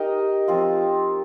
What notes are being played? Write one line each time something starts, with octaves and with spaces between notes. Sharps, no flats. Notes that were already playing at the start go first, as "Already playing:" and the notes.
Already playing: D#4 G4 A#4 D#5
F3 C4 F4